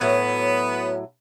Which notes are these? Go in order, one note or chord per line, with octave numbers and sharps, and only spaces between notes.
A2 F#3 B3